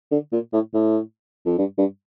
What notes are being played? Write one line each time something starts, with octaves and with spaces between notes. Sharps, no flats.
D3
A#2
A2
A2
F2
G2
G2